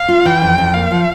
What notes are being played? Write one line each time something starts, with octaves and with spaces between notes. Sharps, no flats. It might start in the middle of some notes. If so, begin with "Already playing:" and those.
Already playing: F5
F4
E3 G5
F2
F2
A#3 F5
F3